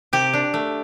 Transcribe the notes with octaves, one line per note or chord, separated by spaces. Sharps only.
C3 G4
D4
A3